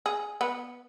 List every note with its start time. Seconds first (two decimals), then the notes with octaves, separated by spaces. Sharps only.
0.06 G#4
0.41 B3